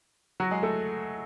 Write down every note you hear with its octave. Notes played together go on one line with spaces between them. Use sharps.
F#3 F#4
G#3 G#4
A3 A4